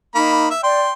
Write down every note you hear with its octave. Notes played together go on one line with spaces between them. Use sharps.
A#3 D#4 B5
E5
D5 G5 C6